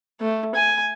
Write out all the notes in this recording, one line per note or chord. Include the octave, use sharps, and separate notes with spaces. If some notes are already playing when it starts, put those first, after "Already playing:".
A3
G#5